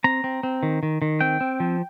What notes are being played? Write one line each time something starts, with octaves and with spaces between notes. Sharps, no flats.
C4 A#5
C4
C4
D#3
D#3
D#3
C4 G5
C4
F3